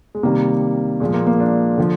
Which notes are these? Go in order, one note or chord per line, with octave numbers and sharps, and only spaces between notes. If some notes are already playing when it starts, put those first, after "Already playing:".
G#3
C3 D#3 G3 A#3
A#2 F3 G#3
A#3
A#3
D4
D3 F3